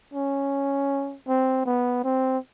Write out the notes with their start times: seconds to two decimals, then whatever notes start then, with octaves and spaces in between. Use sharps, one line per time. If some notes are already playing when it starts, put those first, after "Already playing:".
0.14 C#4
1.28 C4
1.66 B3
2.04 C4